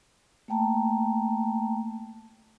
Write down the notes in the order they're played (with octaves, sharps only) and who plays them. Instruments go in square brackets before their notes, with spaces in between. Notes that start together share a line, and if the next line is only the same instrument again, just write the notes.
[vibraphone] A3 A#3 G5 A5 A#5